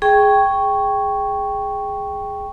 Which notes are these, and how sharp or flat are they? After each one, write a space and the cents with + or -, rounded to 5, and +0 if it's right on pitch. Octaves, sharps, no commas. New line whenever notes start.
G#4 +0 G5 +0 C#6 +0